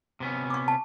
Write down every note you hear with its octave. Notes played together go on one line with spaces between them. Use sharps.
C3 B3 C#4
C#6 D6
A5